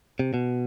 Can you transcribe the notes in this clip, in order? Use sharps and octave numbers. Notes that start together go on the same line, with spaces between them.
C3
B2